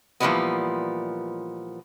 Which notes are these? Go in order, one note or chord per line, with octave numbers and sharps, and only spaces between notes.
A#2 E3 F3 G3 G#3 B3